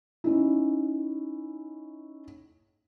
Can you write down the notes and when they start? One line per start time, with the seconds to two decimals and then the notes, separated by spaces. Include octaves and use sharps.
0.24 C#4 D#4 E4